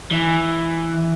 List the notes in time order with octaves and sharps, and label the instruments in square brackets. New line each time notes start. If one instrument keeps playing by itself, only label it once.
[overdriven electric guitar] E3